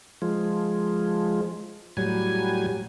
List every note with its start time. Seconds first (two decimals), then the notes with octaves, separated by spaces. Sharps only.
0.22 F3 G#3
1.97 A2 F#3 G3 G#5